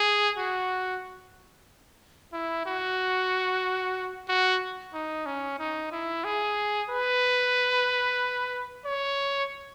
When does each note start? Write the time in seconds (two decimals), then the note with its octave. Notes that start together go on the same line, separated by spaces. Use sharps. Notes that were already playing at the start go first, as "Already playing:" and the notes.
Already playing: G#4
0.38 F#4
2.33 E4
2.66 F#4
4.29 F#4
4.94 D#4
5.26 C#4
5.59 D#4
5.92 E4
6.24 G#4
6.90 B4
8.85 C#5